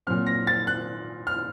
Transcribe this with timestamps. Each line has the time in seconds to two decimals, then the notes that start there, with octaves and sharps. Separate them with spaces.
0.07 A#2 F#3 C4 F6
0.27 A#6
0.47 A6
0.67 F#6
1.27 F6